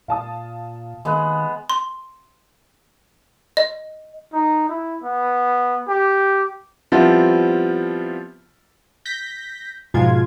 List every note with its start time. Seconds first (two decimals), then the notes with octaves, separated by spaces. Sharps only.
0.08 A#2 F5 A5 D#6
1.05 D#3 G#3 A#3 B3
1.70 C6
3.57 D#5
4.33 D#4
4.69 E4
5.04 B3
5.88 G4
6.92 F3 G3 B3 C4 E4 F4
9.05 G6 A#6 B6
9.94 G#2 B2 F3 G#3 F4 G#6